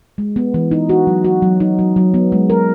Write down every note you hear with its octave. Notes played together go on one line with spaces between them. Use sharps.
G#3
B3
E3
D#4
F#4
F#3
F#4
F#3
D#4
F#3
F#3
B3
G#3
A#4